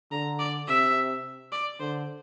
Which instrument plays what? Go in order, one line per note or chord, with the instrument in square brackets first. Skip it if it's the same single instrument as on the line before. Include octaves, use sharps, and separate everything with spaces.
[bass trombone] D3 [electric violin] A#5
[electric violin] D5
[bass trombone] C3 [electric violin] E5
[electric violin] D5
[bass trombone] D3 [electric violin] C5